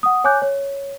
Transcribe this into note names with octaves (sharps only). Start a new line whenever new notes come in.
F#5 D#6
C#5 G#5 D6 F#6 G6
C#5